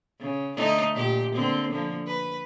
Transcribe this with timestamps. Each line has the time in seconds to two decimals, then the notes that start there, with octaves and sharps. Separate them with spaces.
0.20 C#3
0.57 D3 A3 D#4
0.93 A#2 G4
1.35 D3 A#3 C4
1.71 D3 F3 A#3
2.07 B4